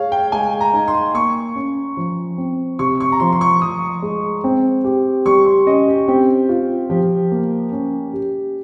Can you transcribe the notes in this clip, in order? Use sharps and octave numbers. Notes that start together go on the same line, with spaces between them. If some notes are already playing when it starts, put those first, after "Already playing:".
Already playing: G#4 C#5 F5
G5
G#3 G#5
A#5
D#4
C6
A#3 C#6
C#4
F3
C4
C3 C#6
C#6
A#5
F3 C6
C6
C#6
F3 D#6
G#3
C4
G4
G3 C#6
C6
C#4 D#5
G4
C4 G4
F4
F3 G4
A#3
C#4
G4